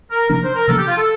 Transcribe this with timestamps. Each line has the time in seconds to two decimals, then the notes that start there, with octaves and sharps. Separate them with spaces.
0.10 A#4
0.30 C3 F3 A#3 D4 A#4
0.43 C5
0.54 A#4
0.67 C3 F3 A#3 D4 A4
0.78 G4
0.87 F4
0.97 A4